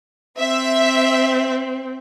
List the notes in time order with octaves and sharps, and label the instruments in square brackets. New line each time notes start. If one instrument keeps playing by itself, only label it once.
[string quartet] C4 [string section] E5